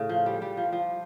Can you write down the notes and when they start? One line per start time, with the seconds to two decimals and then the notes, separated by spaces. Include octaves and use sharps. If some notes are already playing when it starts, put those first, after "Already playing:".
Already playing: A2 C#3
0.09 F3
0.26 G3
0.42 G3
0.57 F3
0.73 F3